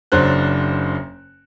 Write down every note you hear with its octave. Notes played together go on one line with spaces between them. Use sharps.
F#1 F#3 D4 C5 F#6